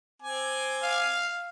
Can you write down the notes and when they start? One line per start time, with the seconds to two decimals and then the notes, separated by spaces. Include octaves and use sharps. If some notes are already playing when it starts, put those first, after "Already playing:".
0.22 C4 G#5 D6
0.83 F5